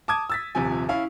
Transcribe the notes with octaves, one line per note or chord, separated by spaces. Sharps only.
A5 D6 D#6 G#6
E6 A6 B6
D#1 C3 F3 G#5
C#4 E4 F5